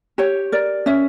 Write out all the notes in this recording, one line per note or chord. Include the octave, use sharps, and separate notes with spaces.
G4 C#5
A#4 D5
C#4 E5